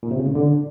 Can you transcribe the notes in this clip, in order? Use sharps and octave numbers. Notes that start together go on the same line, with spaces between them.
A#2
C3
C#3
A2
D3